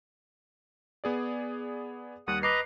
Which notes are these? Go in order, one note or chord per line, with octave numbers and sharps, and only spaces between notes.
B3 G#4 D5
D#2 G3 F#5 D#6
B4 D#5 A#5 D6 C7